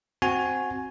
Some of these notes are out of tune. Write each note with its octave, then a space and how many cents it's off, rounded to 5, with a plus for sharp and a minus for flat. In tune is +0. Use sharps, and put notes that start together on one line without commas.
C4 +0 F#4 -10 G#5 +10